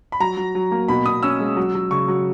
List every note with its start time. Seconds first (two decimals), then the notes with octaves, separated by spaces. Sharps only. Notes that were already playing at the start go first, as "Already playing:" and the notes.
0.12 B5
0.20 F#3 A#5
0.37 F#3
0.55 F#3
0.71 A#3
0.88 B2 B5
1.05 B2 D#6
1.23 C#4 E6
1.40 G#3
1.57 F#3
1.75 F#3
1.91 C#3 C#6
2.08 F#3